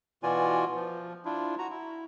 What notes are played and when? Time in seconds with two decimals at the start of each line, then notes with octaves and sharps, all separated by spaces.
0.23 B2 E3 F4 F#4 D5 G#5
0.75 F3
1.25 D4 E4 F4
1.58 F#4 A#5
1.70 E4